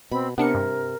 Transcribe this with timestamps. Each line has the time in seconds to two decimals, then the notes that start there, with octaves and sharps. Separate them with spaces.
0.12 B2 C4 B5
0.38 C3 B3 D4 A#4 C#7
0.55 G2